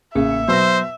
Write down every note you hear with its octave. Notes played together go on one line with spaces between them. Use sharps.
A1 C#3 A#3 E5 C#7
B2 F#3 C5 E6 A#6